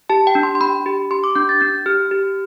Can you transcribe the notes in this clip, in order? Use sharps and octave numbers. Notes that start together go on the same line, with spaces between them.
G4 A5
G5
D4
C6
C6
D4 B5
G4
G4 C6
D6
D4 G6
A6
D4 G6
G4 F6
G4